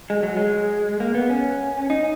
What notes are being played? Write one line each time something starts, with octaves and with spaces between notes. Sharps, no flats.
G#3
F#3
G#3
A#3
B3
C#4
D#4